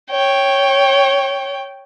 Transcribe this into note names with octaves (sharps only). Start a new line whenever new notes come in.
C#5 G5